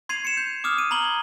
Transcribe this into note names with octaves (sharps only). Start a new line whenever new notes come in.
C6 G#6 C7 D#7 F7
C#7 E7
G6
D6 D#6 F6
D#7
A#5 B5 G#6 F#7 G7